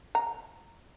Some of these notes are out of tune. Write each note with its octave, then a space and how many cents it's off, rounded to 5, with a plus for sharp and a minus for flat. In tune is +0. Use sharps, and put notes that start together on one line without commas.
A#5 -10